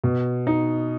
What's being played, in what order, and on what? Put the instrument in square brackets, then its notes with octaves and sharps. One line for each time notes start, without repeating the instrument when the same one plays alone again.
[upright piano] B2
D#4